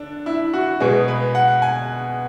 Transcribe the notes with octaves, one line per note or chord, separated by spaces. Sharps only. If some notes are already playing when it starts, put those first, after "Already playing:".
Already playing: D3 D4
E4
F#4
B2 G#3 B3 G#4
B4
F#5
G#5